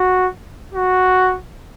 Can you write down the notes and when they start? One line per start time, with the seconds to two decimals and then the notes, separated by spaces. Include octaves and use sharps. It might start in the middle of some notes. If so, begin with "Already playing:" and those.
Already playing: F#4
0.74 F#4